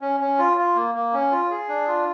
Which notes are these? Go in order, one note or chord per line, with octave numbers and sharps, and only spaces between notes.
C#4
C#4
F4
F4
A#3
A#3
C#4
F4
G#4
D4
F4